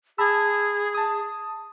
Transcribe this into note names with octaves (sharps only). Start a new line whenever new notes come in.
G#4 A5 B5 E6
A5 D#6